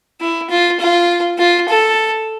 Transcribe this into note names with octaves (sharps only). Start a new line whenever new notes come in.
E4
F4
F4
F4
A4